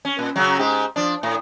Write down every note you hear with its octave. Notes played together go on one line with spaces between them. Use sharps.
C#4
A#2
C#3 F#3
G#2 G4
F3 D4
A2